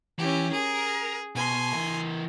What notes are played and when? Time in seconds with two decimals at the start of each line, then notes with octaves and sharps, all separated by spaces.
0.19 E3 C#4 G4
0.52 G#4 A#4
1.35 B2 G#5 C6
1.73 E3 A#4